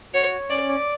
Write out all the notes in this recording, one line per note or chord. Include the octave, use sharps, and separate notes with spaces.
F#4 C#5
C#5
C#4 D5
D5